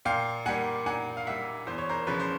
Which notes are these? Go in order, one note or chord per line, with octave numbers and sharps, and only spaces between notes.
A#2 F5 G5
G3 A#3 F#5 G#5
A#2 F#5 G#5
F5
G3 A#3 E5 F#5
E2 C5
C#5
A#4 C5
C#3 F3 B4
C5